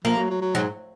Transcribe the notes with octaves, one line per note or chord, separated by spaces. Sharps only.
F3 A#3
F#3
F#3
F#3
G#2 F#3